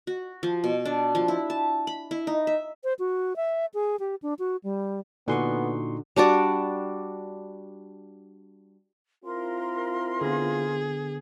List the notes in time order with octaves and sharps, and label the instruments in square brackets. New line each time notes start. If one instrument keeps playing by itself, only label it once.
[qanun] F#4
F3
B2
D4
F3
E4
A5
B5
E4
D#4
E5
[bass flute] C5
F#4
E5
G#4
G4
D4
F#4
G3
[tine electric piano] A#2 C6 C#6 [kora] D3 [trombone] B3 [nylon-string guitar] D#4 F#4 G#5
[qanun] G3 D4 F#4 D5
[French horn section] C4 E4 F4 [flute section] A#4 C6
[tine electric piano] D3 B3 [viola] G#4